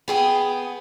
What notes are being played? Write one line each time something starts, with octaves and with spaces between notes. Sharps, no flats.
B3 G#4 G5